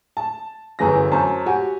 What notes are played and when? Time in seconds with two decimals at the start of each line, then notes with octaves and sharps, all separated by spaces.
0.17 A5
0.79 G1 F#2 E3 G#4 A#6
1.12 F#2 C5 A5
1.46 F#4 G4 G#5